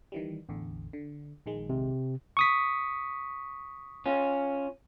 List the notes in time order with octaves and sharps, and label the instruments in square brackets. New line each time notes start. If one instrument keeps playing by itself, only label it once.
[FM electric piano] D#3 E3 G3
A1 E2 D3
D3
A#1 D#3 G#3
[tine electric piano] C3
C#6 D#6 B6
[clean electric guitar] C#4 F4